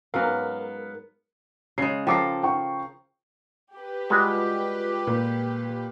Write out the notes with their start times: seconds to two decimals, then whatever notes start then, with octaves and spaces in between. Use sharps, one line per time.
0.14 G#2 F#3 B3 C#4 A#4 F5
1.78 C#3 G#3 C7
2.07 F3 A4 A#4 G5 D6 C7
2.43 G5 C#6
3.76 G4 B4
4.10 G3 G#3 F4 F#4 D6
5.07 A#2